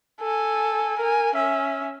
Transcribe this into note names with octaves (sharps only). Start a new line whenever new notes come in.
A4 G#5
A#4 G#5
C#4 E5